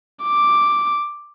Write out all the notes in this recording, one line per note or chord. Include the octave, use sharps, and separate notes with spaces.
D6